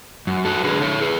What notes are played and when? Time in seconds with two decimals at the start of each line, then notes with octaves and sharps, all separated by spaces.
0.27 F#2
0.45 F#4 A4
0.64 D3 G#4 B4
0.82 A4 C#5
1.01 G#4 B4